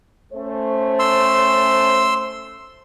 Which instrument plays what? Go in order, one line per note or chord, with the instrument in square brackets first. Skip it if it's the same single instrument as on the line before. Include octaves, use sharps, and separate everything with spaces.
[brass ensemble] A3 C#4 C5
[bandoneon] C6 E6